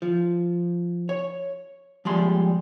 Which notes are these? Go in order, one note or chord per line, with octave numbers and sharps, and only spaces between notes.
F3
C#5
F3 G3 G#3 C6